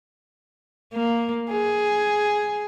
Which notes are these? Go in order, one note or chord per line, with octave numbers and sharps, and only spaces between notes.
A#3
G#4